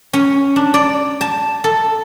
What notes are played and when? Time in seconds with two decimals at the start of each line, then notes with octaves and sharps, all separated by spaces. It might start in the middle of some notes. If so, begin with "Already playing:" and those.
0.13 C#4
0.56 D4
0.74 D5
1.21 A5
1.64 A4